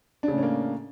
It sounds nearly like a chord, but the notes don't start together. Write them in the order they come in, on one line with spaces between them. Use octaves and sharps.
D4 C#3 A2 C#4 A#3